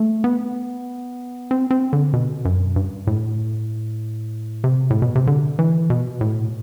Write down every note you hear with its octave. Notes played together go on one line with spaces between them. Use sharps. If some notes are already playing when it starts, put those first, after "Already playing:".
Already playing: A3
B3
C4
C4
D3
B2
F#2
G2
A2
C3
A2
B2
C3
D3
E3
B2
A2